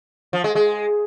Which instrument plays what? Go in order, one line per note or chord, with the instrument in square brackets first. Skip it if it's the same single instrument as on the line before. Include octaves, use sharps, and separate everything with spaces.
[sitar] F3
G#3
G#3